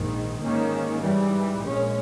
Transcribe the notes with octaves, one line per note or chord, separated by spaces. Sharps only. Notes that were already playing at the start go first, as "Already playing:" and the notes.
Already playing: A#1 G#2 D#3
G#2 D#3 A#3 C#4
G#2 E3 G3
A#1 A#2 G#3 C#4